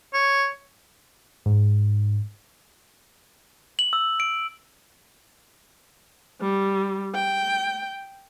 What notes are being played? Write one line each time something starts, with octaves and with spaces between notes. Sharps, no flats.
C#5
G#2
F#7
E6
D7
G3
G5